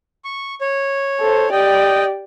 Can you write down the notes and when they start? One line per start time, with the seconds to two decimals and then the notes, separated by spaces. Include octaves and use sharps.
0.24 C#6
0.61 C#5
1.20 A4 C5
1.52 G4 D5 D#5 G5